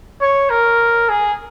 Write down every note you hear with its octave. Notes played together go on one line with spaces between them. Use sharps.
C#5
A#4
G#4